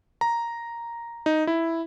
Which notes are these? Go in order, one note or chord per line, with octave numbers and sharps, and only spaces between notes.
A#5
D#4
E4